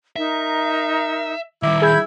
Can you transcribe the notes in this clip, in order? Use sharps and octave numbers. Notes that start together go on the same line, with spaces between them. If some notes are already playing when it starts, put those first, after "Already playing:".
D#4 A#4 E5
D#3 G3 E4 D6
G#4 B5 E6 G6 G#6